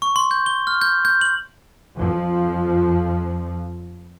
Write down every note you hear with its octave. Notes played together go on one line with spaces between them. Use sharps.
C#6
C6
G6
G7
F6
G6
G6
F#7
F2 F3